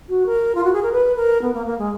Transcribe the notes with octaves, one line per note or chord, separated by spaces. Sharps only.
F#4
A#4
F4
F#4
G#4
A#4
B4
A#4
B3
A#3
A#3
G#3